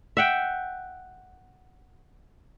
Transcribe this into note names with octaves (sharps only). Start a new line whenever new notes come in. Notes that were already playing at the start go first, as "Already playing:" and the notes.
E5 F#5 G5